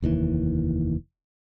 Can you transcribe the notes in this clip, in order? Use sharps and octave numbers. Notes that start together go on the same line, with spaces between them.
F1 D#2 G#2 E3